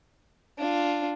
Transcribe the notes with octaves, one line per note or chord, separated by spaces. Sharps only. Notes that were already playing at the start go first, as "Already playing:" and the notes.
D4 F4